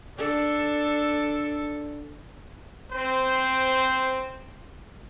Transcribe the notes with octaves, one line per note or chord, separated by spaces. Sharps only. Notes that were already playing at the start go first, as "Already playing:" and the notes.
D4 A4
C4 C5